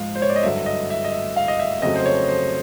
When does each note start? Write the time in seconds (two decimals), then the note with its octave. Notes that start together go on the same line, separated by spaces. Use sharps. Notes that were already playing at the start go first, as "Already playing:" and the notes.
Already playing: G#2 F3 G#3 F5
0.15 C5
0.22 C#5
0.30 D5
0.36 D#5
0.43 G2 D3 F#3 E5
0.66 D#5
0.90 E5
1.05 D#5
1.12 E5
1.36 F5
1.48 D#5
1.59 E5
1.82 F2 C#3 F#3 A3 D#5
1.96 C5
2.06 C#5
2.28 C5